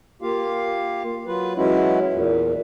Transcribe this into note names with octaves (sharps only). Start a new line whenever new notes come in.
A#3 F4 G4 F5
F#3 F4 B4
E3 F#3 G#3 C#4 E4 F#4
E2 A#2